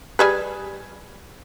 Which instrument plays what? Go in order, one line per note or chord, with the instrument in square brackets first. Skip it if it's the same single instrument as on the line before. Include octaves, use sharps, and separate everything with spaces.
[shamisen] G3 G#4 B4